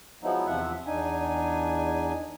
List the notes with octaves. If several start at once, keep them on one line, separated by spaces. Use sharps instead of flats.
F3 F#3 G#3 B3 D#4 E4
E2 C3 F3 F4 E5 F#5
E2 D4 D#4 G#5